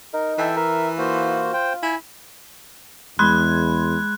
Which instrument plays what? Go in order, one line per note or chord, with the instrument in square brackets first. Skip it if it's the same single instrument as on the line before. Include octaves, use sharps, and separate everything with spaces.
[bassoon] D#4 [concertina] A#4
[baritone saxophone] E3 [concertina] A4 E5 G5
[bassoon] A#4 [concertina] E5
[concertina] A#3 F#4 C5 [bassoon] F4
[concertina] C5 G5
[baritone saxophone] E4 [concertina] G#5
[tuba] E2 [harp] G#3 [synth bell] B5 C6 G#6 [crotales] F#6